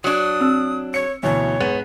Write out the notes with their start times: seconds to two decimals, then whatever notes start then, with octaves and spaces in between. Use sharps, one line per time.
0.04 F#3 D4 D#6
0.41 C4 E6
0.94 C#5 C#7
1.23 D2 B2 E3 C#5
1.60 G#2 B3